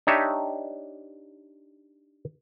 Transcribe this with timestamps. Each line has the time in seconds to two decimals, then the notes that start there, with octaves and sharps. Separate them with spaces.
0.07 D4 D#4 G4 C#5 E5